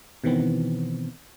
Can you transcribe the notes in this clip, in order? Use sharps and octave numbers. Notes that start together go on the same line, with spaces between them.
B2 D#3 E3 B3 C4